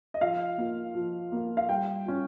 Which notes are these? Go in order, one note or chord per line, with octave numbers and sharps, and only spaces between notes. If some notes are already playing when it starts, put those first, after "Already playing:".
D#5
F3 F5
A#3 F4
F3
A#3 F4
F5
G3 G5
C#4 F4